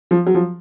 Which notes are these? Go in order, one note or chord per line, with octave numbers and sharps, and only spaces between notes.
F3
F#3
F3